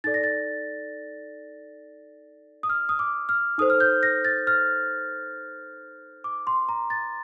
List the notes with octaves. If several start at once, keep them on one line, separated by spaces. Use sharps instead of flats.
D#4 A4 D5 A6
A#6
A6
D#6
F6
D#6
D6
F6
D#4 A4 C5 D#6
F6
G6
A#6
A6
F6
D6
C6
A#5
A6